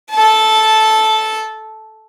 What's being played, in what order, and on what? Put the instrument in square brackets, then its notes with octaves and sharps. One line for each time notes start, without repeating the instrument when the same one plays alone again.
[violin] A4 A5